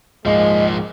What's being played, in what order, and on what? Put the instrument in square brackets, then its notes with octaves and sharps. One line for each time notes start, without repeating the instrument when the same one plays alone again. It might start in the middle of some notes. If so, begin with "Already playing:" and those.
[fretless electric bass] D1 G#2 [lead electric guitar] F3 A#3 [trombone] G#3 [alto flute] D#5